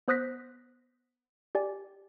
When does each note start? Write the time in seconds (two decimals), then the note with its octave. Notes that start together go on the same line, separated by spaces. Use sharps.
0.08 B3 C5 D#6 F#6 A#6 B6
1.55 G4 D5 G#5